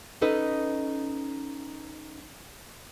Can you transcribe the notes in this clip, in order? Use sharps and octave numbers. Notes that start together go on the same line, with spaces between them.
C#4 D#4 A4 B4 D#5